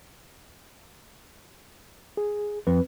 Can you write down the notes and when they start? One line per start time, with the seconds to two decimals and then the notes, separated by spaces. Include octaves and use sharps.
2.17 G#4
2.67 F2 C4 B4